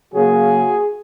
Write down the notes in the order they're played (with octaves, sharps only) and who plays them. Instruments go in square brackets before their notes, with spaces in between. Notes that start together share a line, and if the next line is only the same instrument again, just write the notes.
[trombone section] C#3 F#3 A#3 F#4 G#4